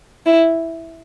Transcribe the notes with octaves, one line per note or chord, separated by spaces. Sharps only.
E4